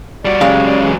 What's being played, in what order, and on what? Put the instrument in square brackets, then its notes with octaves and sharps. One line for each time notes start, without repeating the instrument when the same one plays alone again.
[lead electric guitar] G3 F#4 [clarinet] D5
[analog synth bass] C#3 [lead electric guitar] F#3 G#3 [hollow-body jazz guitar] G4 D#5 F5
[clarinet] D5
E3